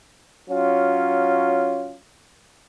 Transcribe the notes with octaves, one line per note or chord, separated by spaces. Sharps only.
F#3 C#4 F4